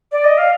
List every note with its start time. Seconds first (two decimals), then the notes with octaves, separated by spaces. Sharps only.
0.12 D5
0.24 D#5
0.38 F5